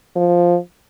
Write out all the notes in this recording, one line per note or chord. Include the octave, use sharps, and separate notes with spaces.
F3